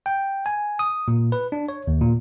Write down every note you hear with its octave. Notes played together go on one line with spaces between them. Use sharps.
G5
G#5
D#6
A#2
B4
D4
C#5
D#2
A#2